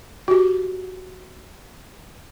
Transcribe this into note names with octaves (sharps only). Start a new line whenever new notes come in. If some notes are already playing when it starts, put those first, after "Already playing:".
F#4 G4